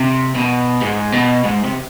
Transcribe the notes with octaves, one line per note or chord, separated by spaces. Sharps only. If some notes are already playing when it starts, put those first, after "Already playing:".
Already playing: C3
B2
G#2
B2
G#2
C3